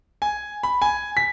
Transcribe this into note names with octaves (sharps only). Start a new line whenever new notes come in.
G#5
B5
G#5
B6